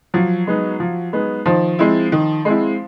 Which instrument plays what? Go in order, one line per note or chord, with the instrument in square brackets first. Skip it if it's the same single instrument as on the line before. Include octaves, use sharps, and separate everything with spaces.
[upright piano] F3 [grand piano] F#3
[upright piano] G#3 B3 D#4
F3
G#3 B3 D#4
[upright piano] D#3 [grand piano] F3
[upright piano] G#3 C4 E4
D#3
G#3 C4 E4